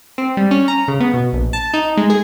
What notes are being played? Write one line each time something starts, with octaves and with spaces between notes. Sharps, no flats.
C4
G3
C#4
A#5
C#3
B3
B2
A#1
A5
D#4
G#3
G#4